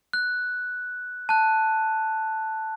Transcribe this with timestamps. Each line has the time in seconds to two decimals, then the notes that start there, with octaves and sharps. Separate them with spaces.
0.13 F#6
1.29 A5 F#6